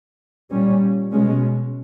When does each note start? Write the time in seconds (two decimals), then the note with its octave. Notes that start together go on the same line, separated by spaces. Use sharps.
0.51 A#2 G3 C#4
1.11 B2 G#3 C#4